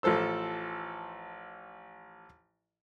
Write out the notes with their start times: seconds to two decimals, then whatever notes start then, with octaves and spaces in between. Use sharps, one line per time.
0.03 A1 F3 A4 C5 E6